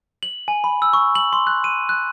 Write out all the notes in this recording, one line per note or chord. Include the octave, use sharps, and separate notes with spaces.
F#7
G#5
B5
E6
C#6
F#7
C6
F#6
D#7
F#6